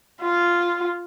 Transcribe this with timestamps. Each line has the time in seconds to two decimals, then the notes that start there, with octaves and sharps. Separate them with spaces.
0.21 F4